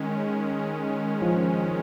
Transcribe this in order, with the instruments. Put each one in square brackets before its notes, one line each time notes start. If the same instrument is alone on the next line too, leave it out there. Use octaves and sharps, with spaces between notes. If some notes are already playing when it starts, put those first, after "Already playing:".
Already playing: [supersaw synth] D#3 G#3 C#4
[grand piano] F3